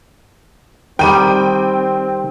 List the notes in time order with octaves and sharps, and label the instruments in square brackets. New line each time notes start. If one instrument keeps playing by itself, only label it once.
[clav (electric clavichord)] D#3 G3 [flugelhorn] C4 [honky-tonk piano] G5 D#7